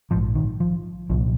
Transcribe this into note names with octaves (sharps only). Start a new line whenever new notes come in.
A#1 G#2 F3
D#3
F3
C2 A#2 F3